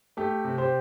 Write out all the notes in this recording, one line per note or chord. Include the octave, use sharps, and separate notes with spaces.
A3 G4
C3
G4 C5